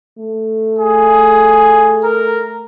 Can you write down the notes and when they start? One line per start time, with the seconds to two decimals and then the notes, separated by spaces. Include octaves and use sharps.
0.19 A3
0.79 G#4
2.04 A#4